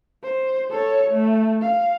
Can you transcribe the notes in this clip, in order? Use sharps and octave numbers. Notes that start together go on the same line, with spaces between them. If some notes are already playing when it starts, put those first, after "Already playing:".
C5
A4 C#5
A3
F5